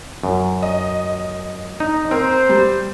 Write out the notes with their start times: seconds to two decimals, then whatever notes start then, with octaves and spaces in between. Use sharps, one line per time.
0.23 F#2
0.62 D#5
1.80 D#4
2.11 C4 A#4 C5
2.49 G3